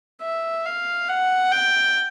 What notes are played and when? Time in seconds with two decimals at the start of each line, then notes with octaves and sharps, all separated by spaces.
0.22 E5
0.66 F5
1.09 F#5
1.52 G5